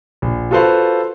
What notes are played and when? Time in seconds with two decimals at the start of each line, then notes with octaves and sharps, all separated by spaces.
0.22 A#1
0.51 F4 F#4 A4 B4 C5 F5